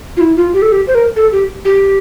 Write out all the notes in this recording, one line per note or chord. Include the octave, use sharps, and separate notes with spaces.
F4
E4
F4
G4
A4
G4
C5
A#4
A4
G4
G4